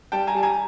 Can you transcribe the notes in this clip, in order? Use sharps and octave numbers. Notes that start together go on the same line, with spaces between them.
G3 G5 A5
G#5 A#5
G3 A5
G#5 A#5